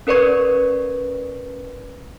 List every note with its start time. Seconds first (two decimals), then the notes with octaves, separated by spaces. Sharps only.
0.07 C#4 A#4 B4 D5 C#6 G#6